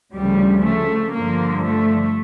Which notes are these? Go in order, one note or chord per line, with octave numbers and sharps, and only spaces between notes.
D2 C#3 F3 G3
A3
G2 D3 F3 A#3
A3